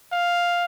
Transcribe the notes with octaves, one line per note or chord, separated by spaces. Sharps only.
F5